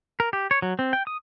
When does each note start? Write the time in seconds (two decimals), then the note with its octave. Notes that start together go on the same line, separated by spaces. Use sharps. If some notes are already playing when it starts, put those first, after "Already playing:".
0.20 A#4
0.33 G4
0.51 C#5
0.62 F#3
0.79 C4
0.93 G5
1.07 D#6